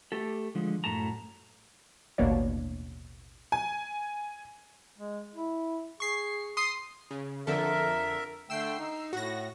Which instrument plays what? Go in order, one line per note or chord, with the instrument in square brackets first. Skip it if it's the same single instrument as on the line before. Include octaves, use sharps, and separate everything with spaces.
[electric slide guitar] A3 G4 A4
D3 F3 G#3
F#2 A2 A3 A5 A#5
[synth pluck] A1 D#2 B2 A#3 D4 C#5
[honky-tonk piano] G#5
[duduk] G#3
E4
[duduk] G#4 [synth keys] C#6 C7
[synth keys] C6 D#6 C7
[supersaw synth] C#3
[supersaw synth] F2 D3 A4 [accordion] A#4 E5
[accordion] D3 A3 G5 [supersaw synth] E6 C7
[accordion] D#4
[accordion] A2 [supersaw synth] F#4 A#6